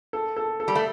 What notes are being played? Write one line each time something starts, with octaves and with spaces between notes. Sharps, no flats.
A4
A4
A4
G3
A3